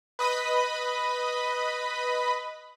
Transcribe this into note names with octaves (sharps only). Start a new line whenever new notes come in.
B4 D#5 B5